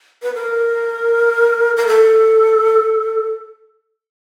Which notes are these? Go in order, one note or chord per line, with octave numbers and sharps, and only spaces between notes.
B4
A#4
A#4
A4